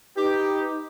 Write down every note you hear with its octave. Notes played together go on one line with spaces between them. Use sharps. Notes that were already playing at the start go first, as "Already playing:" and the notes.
D#4 G4 B4